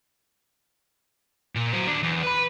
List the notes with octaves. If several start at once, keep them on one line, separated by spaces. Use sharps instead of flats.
A#2
F#3 C5
D#2 D4
E2
B4 B5